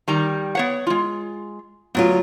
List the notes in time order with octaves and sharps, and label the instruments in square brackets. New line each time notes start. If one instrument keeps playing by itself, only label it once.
[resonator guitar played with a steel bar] D#3 G3 A#5
B3 C#5 F#5
G#3 F4
[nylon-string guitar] D2 F#3 F4 [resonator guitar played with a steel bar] B3